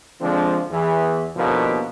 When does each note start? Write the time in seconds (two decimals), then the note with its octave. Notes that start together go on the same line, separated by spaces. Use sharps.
0.20 D3 F3 G#3 C4 D4
0.70 E2 E3
1.36 D#2 B2 D3 F3 A#3